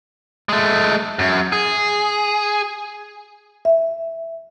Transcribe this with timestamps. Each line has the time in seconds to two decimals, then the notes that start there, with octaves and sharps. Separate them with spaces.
0.49 G#3 A3
1.19 F#2
1.52 G#4
3.65 E5